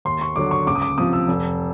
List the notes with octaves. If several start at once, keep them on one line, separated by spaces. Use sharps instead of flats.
D#2 C6
C#6
D3 F#3 D6
C#6
C#2 D6
D#6
D6
C3 F3 D#6
E6
F1